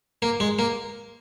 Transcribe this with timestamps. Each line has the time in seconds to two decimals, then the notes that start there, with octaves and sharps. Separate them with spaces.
0.22 A#3
0.40 G#3
0.59 A#3